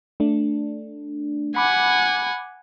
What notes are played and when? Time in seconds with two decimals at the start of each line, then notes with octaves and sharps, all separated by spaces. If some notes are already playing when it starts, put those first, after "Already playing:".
0.20 A3 D4
1.56 F#5 G#5 B5 D6